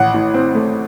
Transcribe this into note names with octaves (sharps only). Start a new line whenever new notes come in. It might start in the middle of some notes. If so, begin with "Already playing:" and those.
Already playing: A1 F#5
A2
C4
A3